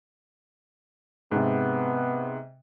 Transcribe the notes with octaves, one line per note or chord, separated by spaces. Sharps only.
G#2 C3 B3